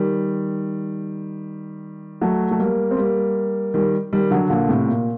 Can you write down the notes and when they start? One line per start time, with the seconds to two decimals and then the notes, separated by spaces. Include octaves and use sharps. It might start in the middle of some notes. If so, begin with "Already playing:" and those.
Already playing: D#3 G3
2.21 F#3 A3
2.51 A3
2.59 G3 A#3
2.91 C4
2.97 G3 A#3
3.74 D#3 G3
4.13 D#3 G3
4.31 D3 F#3
4.50 A#2 D3
4.69 A2 C3
4.88 A#2